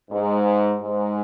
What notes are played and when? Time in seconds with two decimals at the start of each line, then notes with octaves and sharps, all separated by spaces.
0.10 G#2
0.82 G#2